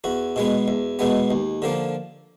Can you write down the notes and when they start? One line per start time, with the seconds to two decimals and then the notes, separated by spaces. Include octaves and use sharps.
0.04 E2 F#4
0.36 B2 G#3 B3
0.68 E2
0.99 B2 G#3 B3
1.31 D#2
1.62 D3 F3 A#3